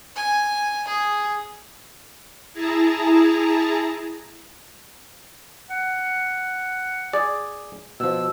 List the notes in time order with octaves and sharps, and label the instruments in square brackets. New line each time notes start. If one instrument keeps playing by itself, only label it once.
[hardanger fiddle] G#5
G#4
[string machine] E4 G#4 A5 A#5
[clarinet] F#5
[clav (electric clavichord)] G#4 D5
[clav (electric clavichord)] B2 F3 [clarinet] E6